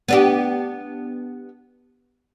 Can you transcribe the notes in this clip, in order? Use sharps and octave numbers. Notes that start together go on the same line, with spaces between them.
B3 D4 G4